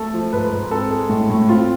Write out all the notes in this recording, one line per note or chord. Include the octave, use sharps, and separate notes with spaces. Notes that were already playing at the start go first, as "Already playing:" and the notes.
Already playing: A3 A4
F3
G#2 B4
G#2
C4 A4
G#3
A2
A2
C4 F4